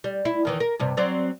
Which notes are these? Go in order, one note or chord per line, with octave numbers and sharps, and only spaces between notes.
G3
E4
E2 D#3 E3
A#4
G2 C3
F#3 C4 D5